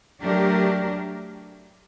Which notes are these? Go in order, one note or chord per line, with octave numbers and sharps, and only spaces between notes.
F#3 A3 D4 G4 A#4